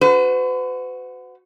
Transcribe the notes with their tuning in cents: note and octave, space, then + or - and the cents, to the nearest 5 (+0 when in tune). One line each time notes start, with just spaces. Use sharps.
F#4 -10 B4 +45